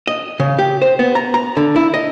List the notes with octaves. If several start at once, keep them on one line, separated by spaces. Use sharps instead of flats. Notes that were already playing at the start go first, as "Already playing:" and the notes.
D#5
C#3
G4
C5
B3
A#5
A#5
D3
E4
D#5